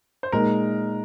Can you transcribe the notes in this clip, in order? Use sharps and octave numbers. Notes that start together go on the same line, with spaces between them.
C5
A#2 G#3 D#4 A#4